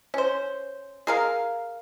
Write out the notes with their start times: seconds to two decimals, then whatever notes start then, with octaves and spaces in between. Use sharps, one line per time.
0.14 C#4 C5
1.07 G#4 A#4 F5